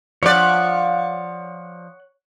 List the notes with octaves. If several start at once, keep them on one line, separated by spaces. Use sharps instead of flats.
F3 C#5 D5 F#5